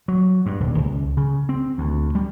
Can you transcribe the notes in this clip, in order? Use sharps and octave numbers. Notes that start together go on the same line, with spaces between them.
F#3
G2
D#1
C#2
C#3
C4
D2
G3